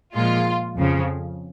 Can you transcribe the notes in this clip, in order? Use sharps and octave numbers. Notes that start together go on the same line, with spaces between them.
A#2 F3 G#3 F4
F2 C#3 F3